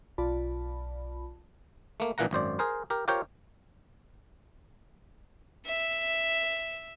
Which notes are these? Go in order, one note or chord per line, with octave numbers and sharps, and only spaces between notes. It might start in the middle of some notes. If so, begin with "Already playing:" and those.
B1 F4 D5 A5 B5
A3 A#3
A#1 A#2 E3 A#3 F#5 A#5
G#1 F#2 C5 D5
G#4 A#4 C5
G4 A#4
F4 G4 A#4 C5 C#5 G5
E5